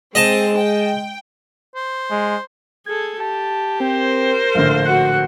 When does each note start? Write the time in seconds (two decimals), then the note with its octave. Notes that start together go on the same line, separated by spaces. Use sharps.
0.15 G#3 C4 G#4 D#5 A5
0.57 G5
1.75 C5
2.11 G#3
2.86 G#4 A4 G#6
3.20 G4 A5
3.80 C4 A#4 C5
4.55 A#1 A2 D3 F5
4.85 F#4 F#5 F#6